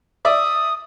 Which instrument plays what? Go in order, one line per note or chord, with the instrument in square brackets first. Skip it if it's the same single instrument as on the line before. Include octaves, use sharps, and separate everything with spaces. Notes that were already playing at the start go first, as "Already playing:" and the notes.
[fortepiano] D5 E5 [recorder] D#6